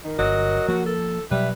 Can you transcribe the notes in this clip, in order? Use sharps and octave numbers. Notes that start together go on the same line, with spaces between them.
D#3 A#4
G1 F#3 D#5
F3 A#3 F#4
A4
B2 F#3 G3 B4 E5